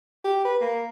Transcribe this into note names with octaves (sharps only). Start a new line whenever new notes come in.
G4
B4
A#3